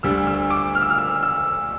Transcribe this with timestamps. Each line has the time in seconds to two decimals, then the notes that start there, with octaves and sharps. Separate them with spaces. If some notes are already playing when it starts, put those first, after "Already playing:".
0.03 D2 D3 G3 E6
0.27 E6
0.50 D6
0.75 F6
0.82 E6
0.90 F6
0.98 E6
1.23 E6